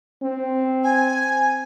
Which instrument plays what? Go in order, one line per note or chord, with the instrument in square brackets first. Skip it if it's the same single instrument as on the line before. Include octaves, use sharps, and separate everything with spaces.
[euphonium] C4
[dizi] G#5